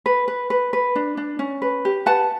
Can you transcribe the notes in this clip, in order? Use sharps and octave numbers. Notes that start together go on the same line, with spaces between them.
B4
B4
B4
B4
D4
D4
C#4
B4
G4
B4 F#5 A5